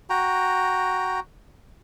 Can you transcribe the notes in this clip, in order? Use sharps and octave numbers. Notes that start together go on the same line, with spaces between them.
F#4 G5 A#5